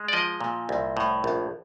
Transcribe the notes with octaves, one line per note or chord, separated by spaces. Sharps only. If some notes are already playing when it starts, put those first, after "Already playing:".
Already playing: G#3
D5
F3 D#5
A#2
C2
A2
A#1